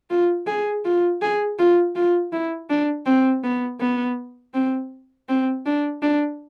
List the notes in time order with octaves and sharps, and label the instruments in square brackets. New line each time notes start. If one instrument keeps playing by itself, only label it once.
[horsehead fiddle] F4
G#4
F4
G#4
F4
F4
E4
D4
C4
B3
B3
C4
C4
D4
D4